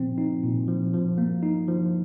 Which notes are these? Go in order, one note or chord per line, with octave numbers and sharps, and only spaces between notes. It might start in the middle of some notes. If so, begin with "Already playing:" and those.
Already playing: A#2 F3 C4
D#4
A#2
F3
F3
A#3
D#4
F3